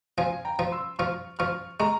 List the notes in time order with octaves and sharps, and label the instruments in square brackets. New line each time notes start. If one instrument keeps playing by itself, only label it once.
[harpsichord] F3 [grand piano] F5 G#5
[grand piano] G5 A#5
[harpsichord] F3
[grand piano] C6 E6
[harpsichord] F3 [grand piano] C#6 F6
[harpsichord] F3 [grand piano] C#6 F6
[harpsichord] G#3 [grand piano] A#5 C#6